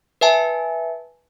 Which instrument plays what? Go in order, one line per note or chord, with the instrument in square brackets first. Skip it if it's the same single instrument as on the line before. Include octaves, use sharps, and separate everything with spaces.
[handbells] B4 E5 G#5 A5